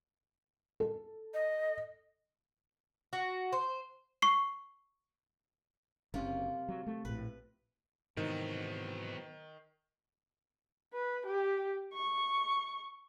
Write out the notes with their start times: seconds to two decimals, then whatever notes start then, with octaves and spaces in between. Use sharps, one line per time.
0.80 A4
1.34 D#5
3.13 F#4
3.52 C5
4.22 C#6 C7
6.14 F#1 C3 A#3 C#4 F4
6.69 F#3
6.87 A3
7.05 A#1 A2 B4
8.17 G#2 C3 D#3 E3 F#3 B3 C5
10.93 B4
11.26 G4
11.93 C#6